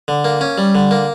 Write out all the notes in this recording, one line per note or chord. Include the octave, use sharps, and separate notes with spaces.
D3
A#3
C#4
G3
D3
A#3